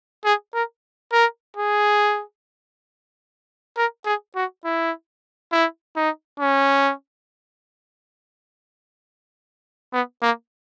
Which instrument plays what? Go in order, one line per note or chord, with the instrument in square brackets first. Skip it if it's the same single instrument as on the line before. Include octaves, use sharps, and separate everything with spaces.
[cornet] G#4
A#4
A#4
G#4
A#4
G#4
F#4
E4
E4
D#4
C#4
B3
A#3